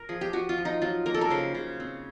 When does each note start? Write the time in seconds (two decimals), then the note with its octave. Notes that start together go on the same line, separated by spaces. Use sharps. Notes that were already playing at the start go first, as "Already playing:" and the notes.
Already playing: A#4
0.09 F3 G#4
0.21 G4
0.33 F3 F#4
0.49 F4
0.58 F3
0.65 D#4
0.82 F#3 F4
1.06 A#3 A#4
1.14 A4
1.21 A#4
1.30 C#3 C5
1.54 C#3
1.80 C4